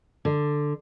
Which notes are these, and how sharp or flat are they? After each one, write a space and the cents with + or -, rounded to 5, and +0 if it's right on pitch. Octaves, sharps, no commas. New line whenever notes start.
D3 +5